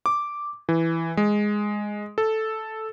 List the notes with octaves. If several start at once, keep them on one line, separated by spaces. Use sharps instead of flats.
D6
E3
G#3
A4